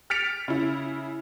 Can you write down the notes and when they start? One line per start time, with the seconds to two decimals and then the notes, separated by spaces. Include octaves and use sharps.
0.10 F6 A6 B6 C#7 D7 F7
0.48 C#3 E4